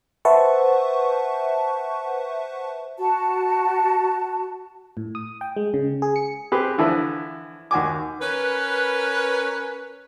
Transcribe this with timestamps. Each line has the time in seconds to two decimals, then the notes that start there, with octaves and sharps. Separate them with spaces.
0.25 B4 C5 E5 F#5 A5 C#6
2.98 F#4 A5
4.97 A2
5.15 D#6
5.41 G5
5.57 G#3
5.74 C#3
6.02 G#4
6.16 C#7
6.52 C4 G4 G#4 B4
6.78 D3 E3 F3 E4
7.71 D#2 F#4 G#5 D6
8.21 C#4 A#4 B4